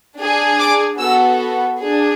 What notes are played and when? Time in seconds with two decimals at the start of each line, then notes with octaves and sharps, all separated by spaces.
0.18 D4 G#4
0.59 D6
0.98 B3 F#4 A4 E6
1.79 D4 G#4